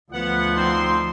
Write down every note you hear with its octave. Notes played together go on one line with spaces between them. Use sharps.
D2 F3 B3 F#5
C4 D#4 C6